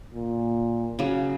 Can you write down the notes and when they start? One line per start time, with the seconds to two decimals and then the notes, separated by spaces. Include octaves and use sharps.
0.14 A#2
0.99 C#3 F#3